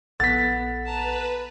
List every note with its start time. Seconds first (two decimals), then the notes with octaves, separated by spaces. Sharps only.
0.20 A#1 B3 A4 F#5 A6 B6
0.86 B4 A5 A#5